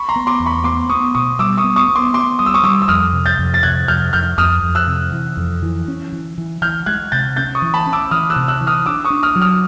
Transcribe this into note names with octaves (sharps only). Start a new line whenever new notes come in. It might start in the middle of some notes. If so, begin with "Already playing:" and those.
Already playing: B5 C#6
A#5 C6
B3
C6 D6
E2
B5 C#6
B3 C6 D6
B3 C#6 D#6
B2 C#6 D#6
G3 D6 E6
C#6 D#6
B3
C#6 D#6
B3
C6 D6
B3 C6 D6
G3 D#6
E6
C#6 D#6
G3 D6 E6
E6
F2 D#6 F6
C3
G6 A6
F2
A6
C3 F#6 G#6
F2 F6 G6
F2 F6 G6
F2 D#6 F6
F2
E6 F#6
C3
E3
F2
E3
C#4
E3
E3
E3 F6 G6
G#3 F#6 G#6
C3 G6 A6
C#4 G6 A6
C#6 D#6
E3
A5 B5
C#4
D6 E6
E3 D#6 F6
E6 F#6
C3
E6 F#6
E3
D#6 F6
D4 D6 E6
C#6 D#6
D4
D#6 F6
F#3
D#6 F6